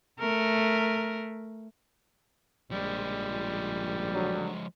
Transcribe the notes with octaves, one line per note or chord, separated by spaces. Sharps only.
A3 A#4
A#1 F3 G3 G#3
D3 F#3